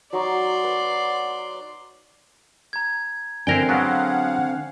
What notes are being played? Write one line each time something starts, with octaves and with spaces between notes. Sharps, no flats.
F#3 D#4 D5 C6 C#6
B4
A#5 G#6
D3 C4 D4 E4 A#4 G5 G#5 C7
F#3 G#3 B3 F5 F#5